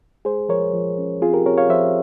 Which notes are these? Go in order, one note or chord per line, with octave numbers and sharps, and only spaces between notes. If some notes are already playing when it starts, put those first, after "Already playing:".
G#3 G#4 C5
F3 A#4 C#5
F3
C#4
C4 F4 G#4
G4 A#4
C4 A#4 C#5
C#5 F5
F3 C5 E5